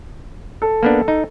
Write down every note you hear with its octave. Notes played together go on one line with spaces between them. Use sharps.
A4
A#3 B3 D4
D#4